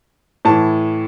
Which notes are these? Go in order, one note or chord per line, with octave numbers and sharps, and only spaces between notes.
A2 E3 A5